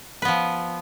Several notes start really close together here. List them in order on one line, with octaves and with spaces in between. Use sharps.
B4 B3 F3